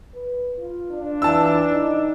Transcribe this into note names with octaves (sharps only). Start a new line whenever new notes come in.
B4
F4
D4
E3 A5 E6
D#4